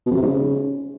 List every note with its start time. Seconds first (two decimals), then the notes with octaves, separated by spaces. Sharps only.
0.06 B2
0.11 F2
0.16 C3
0.21 G#2
0.27 C#3